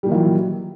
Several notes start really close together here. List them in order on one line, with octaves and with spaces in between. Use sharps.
G3 A#2 D#3 E3 F#3